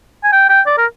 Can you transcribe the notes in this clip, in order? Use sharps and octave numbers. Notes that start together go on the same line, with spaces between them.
G#5
G5
G5
D5
A#4